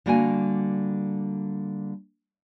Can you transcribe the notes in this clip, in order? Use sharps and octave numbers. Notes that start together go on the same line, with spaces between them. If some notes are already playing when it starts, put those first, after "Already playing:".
D3 G3 A#3 F#4 F5 G#5